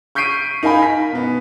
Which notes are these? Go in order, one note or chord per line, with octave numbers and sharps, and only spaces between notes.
C#6 G6 B6 C7 D7 D#7
D#4 A#4 F5 G#5 B5
B6
B2 B3